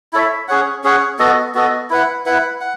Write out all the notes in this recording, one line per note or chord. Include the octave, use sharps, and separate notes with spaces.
E4 A4 C#5 E5
C#4 G#4 C#5 F#5
C#4 G#4 C#5 F#5
B3 F#4 A4 D#5
B3 F#4 A4 D#5
E4 B4 F#5
E4 B4 F#5
F#5